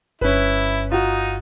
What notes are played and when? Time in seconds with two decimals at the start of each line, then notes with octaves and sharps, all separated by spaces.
0.21 G1 G2 C#4 E4 B4
0.92 D#4 F4 F#4